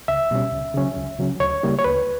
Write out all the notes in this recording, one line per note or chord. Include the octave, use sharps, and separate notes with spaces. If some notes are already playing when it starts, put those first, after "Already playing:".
C#2 E5
B2 G3 C#4
C#2
C#3 F#3 C#4
C#2
C#3 F#3 C#4
D2 C#5
C#3 G3 A#3 E4
C#5
D2 B4